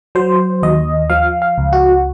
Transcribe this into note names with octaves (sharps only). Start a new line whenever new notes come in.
F#3 C5
D#2 D#5
F3 F5
F5
C#2
F#4